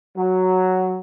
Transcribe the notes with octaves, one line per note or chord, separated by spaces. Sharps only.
F#3